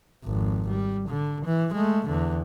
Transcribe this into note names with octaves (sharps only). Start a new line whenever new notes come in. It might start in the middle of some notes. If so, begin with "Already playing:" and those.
G#1 F2
G3
D3
E3
G#3 A3
E2 D3